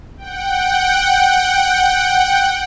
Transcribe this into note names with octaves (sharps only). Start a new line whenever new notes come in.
F#5 G5